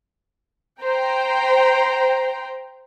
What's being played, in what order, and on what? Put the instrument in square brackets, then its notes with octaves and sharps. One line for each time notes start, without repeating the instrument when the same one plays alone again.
[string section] C5 G5 A#5